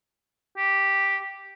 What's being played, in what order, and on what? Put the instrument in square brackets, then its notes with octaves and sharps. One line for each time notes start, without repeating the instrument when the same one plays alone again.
[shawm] G4